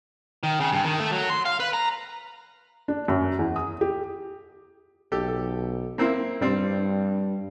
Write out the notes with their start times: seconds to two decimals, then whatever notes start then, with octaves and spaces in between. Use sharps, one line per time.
0.43 D#3
0.60 C#3
0.72 G2
0.85 D#3
1.00 A3
1.12 F#3
1.30 C6
1.45 F5
1.60 B4
1.73 A#5
2.88 D4
3.08 F#2
3.39 E2
3.56 D#6
3.81 G4
5.12 B1 G4 A4
5.98 A#3 C4 E4
6.41 G2 G3 C4